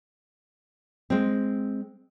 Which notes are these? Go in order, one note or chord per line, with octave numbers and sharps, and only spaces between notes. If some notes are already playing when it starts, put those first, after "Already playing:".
G#3 C4